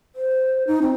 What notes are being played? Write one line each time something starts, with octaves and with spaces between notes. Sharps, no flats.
C5
D#4
C4